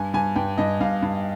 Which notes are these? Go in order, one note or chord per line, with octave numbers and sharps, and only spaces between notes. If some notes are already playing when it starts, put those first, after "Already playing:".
Already playing: G2 G#5
G2 G#5
G2 G5
G2 D#5
G2 F5
G2